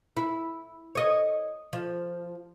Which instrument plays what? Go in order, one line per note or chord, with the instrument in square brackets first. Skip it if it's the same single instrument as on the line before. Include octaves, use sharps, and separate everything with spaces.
[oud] E4
C#5 D#5
F3